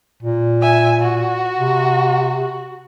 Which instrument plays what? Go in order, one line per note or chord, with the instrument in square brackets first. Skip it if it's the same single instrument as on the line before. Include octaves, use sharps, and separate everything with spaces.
[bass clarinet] A#2
[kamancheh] E5 G#5
F#4
[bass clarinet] C3